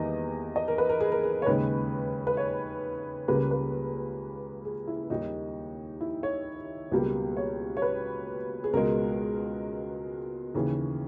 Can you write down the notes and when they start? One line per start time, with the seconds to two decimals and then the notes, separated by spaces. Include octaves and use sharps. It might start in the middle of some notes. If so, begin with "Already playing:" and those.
Already playing: E2 D#3 G3 A#3 D#5
0.56 D#5
0.68 A#4
0.78 B4
0.89 A#4
1.00 G#4
1.12 A#4
1.23 G#4
1.42 C#5
1.46 D#2 C#3 G#3 B4
2.27 B4
2.37 C#5
3.28 C#2 C#3 G3 A#3 B4
3.51 B4
4.65 G#4
4.88 E4
5.10 D#2 D#3 G3 A#3 D#4
6.01 E4
6.23 C#5
6.92 C#2 B2 G3 A#3
7.37 C#5
7.77 C#5
7.82 B4
8.64 G#4
8.73 C#2 B2 G#3 A#4
10.54 D#2 C#3 E3 G#4